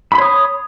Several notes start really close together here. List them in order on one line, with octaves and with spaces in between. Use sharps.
B5 C6 C#5 D#6